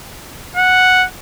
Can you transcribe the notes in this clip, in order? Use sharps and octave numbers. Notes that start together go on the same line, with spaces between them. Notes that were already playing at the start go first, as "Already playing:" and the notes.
F#5